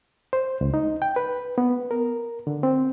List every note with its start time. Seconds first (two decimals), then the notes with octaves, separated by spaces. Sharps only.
0.33 C5
0.61 C#2
0.74 D#4
1.02 G5
1.16 B4
1.58 B3
1.91 A#4
2.47 D3
2.63 C4